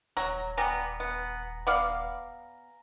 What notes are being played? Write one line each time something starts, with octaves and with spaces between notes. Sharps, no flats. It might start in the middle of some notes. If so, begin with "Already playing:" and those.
D#1 F#3 A#5
G3 B3 G#5 A#5 A#6
B3
B3 D5 F5